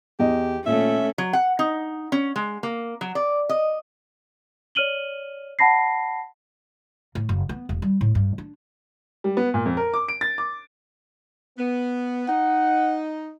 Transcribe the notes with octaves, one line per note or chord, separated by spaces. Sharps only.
E2 G4 D#5
A#2 A3 C#4 E5
F#3
F#5
D#4
C#4
G#3
A#3
F#3
D5
D#5
C#5 D5 F6 D#7 F#7 G7
F#5 A5 B5 A#6 C7
A2
F#1
B3
E1
G3
A2
G2
D4
G3
B3
A#2
F2
A#4
D6
D7
A6
D6
B3
D#4 F#5